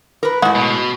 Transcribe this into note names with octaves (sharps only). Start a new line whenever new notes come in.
A#4 B4
A2 G#3 F#4
B2